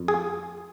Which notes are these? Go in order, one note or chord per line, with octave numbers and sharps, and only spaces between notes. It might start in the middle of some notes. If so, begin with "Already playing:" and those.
Already playing: F2
G#4